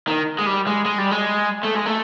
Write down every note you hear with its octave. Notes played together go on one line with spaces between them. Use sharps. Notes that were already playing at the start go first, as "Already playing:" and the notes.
D#3
G#3
G3
G#3
G#3
G3
G#3
A3
G#3
A3